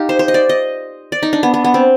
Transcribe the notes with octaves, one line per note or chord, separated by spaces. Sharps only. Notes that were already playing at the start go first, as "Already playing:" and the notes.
Already playing: D#4 F4 G4
C5
C5
D#5
D5
D#5
D5
D#4
D4
B3
B3
B3
C4